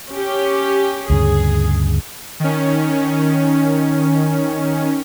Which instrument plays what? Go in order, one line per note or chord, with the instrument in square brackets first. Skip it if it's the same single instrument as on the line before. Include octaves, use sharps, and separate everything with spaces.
[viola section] C#4 G4
[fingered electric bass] D2 G2 C#3 [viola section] G#4
[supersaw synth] D#3 C#4